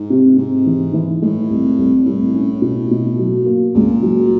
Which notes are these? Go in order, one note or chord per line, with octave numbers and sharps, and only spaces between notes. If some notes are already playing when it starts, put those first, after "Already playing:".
Already playing: G#2
C3
G#2 C3
E3
E3
A2 G#3
C2
C2
C2 A2
C#4
B2
B2
F#3
A#3
C#2 A#2
F#3